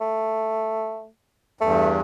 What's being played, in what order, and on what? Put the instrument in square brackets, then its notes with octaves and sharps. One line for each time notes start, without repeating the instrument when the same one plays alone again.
[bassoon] A3
[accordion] E2 G2 [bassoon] A3